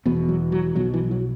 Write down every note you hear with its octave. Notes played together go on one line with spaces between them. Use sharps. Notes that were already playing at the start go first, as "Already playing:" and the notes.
E1 E2 B2 B3
F#3
F#3
B1 B2 F#3
E3
F#3